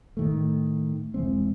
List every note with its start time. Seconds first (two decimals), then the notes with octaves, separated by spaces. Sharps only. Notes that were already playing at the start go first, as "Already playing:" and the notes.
0.17 A2 D#3 A3
1.14 E1 E3 G#3 C4